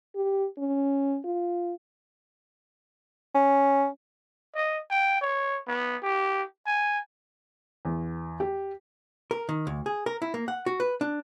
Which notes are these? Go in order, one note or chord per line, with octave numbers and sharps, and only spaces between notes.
G4
C#4
F4
C#4
D#5
G5
C#5
B3
G4
G#5
E2
G4
A#4
D#3
D2
G#4
A#4
E4
A#3
F#5
F#4
B4
D4